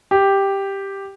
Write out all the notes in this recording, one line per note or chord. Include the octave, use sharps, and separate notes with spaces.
G4